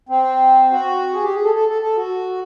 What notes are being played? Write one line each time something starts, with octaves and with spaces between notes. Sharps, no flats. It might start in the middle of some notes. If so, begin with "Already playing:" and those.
C4
F#4
G#4
G4
G#4
A4
A4
A4
A4
F#4